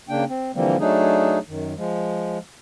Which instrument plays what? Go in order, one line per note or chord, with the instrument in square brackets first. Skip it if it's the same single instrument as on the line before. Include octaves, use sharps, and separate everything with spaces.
[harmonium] C#3 A#3 D4 G5
C4
D3 E3 F3 G3 A#3 C4
F#3 A3 D4 D#4 G#4
F#2 D#3
F3 G#3